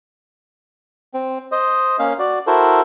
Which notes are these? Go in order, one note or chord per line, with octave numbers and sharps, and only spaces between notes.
C4
C5 D#5
A#3 C#4 F5
F#4 D5
E4 F#4 A4 A#4 C5